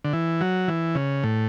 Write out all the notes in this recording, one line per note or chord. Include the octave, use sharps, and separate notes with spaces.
D3
E3
F#3
E3
C#3
A2